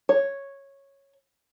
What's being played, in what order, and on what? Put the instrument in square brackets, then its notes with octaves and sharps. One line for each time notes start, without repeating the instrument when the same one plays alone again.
[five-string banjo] C#5